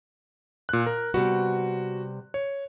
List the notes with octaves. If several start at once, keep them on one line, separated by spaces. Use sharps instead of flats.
A#2 F#6
A#4
C3 G3 B3 F#4
C#5